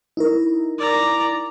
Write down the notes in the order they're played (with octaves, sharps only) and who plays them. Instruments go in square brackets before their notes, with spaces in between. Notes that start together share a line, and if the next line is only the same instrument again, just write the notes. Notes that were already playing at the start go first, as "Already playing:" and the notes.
[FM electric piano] D#4 E4 A#4
[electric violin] D5 A#5